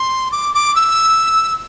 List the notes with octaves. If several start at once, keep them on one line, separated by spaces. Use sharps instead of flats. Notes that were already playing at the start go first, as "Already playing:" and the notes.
Already playing: C6
D6
D6
E6